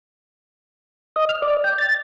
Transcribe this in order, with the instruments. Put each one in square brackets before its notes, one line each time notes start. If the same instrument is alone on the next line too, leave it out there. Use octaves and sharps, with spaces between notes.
[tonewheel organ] D#5
F6
D5
G5
A6